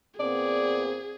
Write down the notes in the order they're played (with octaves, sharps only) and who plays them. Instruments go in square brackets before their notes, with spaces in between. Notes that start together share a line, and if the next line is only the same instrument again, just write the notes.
[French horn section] A#2 B3 C4 [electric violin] G#4 [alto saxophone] D5